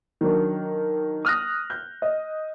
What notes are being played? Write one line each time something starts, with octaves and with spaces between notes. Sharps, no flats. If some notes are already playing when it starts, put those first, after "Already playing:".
D#3 F#3 D4
D#6 F6 F#6 A#6
G6
D#5